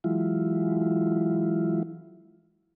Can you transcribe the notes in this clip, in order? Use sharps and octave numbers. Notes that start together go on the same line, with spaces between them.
E3 F#3 G#3 E4 F4